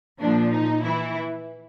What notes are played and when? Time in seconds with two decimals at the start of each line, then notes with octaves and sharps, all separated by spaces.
0.20 A#2 F3 D4
0.52 D#4
0.83 E3 E4